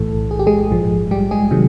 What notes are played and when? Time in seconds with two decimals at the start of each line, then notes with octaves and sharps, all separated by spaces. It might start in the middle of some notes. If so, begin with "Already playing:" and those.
Already playing: B1 A2 E3 A4
0.31 G#4
0.39 G4
0.47 G#3 G#4
0.71 A#1 G#2 F3
1.11 G3 G4
1.31 G#3 G#4
1.51 C3 D#3 F#3